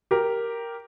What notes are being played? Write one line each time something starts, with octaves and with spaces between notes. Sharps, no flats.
G4 A#4